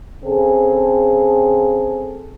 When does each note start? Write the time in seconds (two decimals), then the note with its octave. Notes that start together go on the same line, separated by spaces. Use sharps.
0.23 C#3 C4 G#4 A4